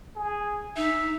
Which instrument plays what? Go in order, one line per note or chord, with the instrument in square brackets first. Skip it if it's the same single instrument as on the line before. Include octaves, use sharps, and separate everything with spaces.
[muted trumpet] G#4
[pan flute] D#4 [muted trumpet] E5